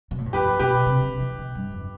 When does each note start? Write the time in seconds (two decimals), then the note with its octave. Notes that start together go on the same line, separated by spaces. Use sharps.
0.11 B2
0.18 A2
0.26 G2
0.33 F2 G4 B4
0.59 B2 G4 B4
0.86 C3
1.03 D3
1.20 E3
1.38 B2
1.55 G2
1.72 F2